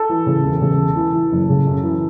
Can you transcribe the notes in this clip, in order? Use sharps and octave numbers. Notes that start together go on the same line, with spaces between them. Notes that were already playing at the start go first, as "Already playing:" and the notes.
Already playing: A4
E3
C#3
E1
C#3
E1
E3
E3
F#1
C#3
F#2
E3